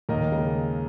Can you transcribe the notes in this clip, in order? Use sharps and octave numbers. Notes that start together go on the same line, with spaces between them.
D#2 A#4 D#5
C#3 G#3